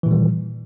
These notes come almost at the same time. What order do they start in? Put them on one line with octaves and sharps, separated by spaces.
E3 A#2 D#3 G3